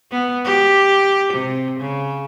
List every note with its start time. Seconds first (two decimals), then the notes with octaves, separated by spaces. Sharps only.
0.11 B3
0.45 G4
1.33 C3
1.80 C#3